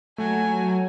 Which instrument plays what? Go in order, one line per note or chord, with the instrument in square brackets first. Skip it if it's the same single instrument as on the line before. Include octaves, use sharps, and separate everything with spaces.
[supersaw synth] F#3 [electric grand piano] A3 [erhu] G#5